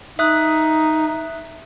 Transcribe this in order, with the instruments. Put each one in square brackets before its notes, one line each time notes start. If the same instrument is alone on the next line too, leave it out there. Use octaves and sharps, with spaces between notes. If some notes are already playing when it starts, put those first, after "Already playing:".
[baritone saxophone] D#4 [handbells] E5 D#6 F#6